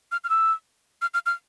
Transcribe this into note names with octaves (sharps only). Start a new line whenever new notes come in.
F6
F6
E6
F6
F6
F6